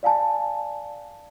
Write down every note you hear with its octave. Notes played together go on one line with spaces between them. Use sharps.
D5 F5 G#5 A5